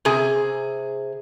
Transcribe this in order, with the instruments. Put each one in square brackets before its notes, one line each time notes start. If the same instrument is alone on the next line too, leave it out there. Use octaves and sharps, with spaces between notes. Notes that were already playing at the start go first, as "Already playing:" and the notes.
[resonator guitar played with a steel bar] C3 G#4